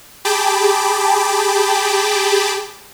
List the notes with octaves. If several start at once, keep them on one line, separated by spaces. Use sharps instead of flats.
G4 G#4 G5 A5 B5 D6